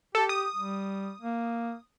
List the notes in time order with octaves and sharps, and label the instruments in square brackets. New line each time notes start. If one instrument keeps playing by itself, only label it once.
[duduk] G4 [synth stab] A4
[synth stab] D#6
[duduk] G3
A#3